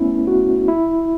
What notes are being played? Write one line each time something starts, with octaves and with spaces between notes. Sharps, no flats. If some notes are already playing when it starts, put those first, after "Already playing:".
Already playing: A3 B3 C#4 E4
F#4
E4